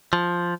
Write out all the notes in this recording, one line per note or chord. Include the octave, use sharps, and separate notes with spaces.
F3